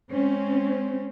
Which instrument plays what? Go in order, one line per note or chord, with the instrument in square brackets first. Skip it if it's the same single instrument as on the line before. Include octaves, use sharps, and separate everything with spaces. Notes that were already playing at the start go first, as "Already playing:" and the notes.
[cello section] G#3 C4 C#4